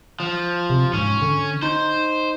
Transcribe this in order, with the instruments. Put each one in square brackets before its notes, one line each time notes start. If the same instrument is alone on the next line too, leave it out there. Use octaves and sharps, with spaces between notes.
[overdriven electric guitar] F3
[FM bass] C3
[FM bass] G#2 [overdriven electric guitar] C#4
[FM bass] D3
[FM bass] D#4 [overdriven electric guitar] C5